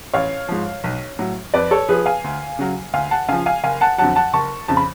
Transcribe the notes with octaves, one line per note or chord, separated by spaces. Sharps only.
A1 C#5 F5
G#2 F3
B1
A2 F#3
F2 B4 D5
A4 C#5
F3 G#4 B4
F5 G#5
D2
C#3 F#3
D2 F5 G#5
F#5 A5
C#3 F3 F5 G#5
F5 G#5
F#1 F5 G#5
F#5 A5
F2 D3 F#3 F#5 A5
F#5 A5
F#1 A5 C#6
F2 C#3 A5
B5